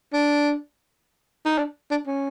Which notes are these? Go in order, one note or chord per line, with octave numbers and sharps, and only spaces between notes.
D4
D#4
D4
D4
C#4